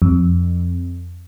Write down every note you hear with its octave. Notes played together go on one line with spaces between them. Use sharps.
F2